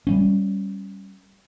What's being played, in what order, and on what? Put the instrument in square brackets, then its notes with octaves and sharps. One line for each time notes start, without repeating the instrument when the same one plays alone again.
[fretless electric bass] G3 B3 C#4